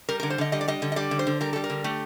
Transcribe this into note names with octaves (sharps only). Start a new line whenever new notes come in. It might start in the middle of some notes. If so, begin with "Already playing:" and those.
G3 A#4
D3 A#4
C5
D3 D#5
G3 D#5
D5
G3 D#5
D3
D#5
G3 D5
D3
C5
D3
G3 A#4
G3 A4
A#4
D3
A3 G4